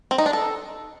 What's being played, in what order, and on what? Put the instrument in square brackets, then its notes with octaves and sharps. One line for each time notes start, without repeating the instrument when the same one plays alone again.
[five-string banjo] C4
D#4
D4
A4